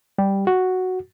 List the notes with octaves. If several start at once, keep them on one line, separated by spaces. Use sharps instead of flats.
G3 G4
F#4